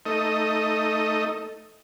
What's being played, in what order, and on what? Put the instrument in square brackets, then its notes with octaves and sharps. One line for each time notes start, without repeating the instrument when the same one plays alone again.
[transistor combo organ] A3 D#4 D#5